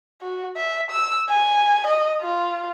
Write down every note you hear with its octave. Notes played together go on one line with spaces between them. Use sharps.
F#4
E5
E6
G#5
D#5
F4